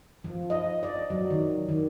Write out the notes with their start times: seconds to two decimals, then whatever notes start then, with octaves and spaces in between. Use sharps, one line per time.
0.24 F3
0.50 D#5
0.83 D5
1.10 F#3
1.30 D#3
1.69 D#3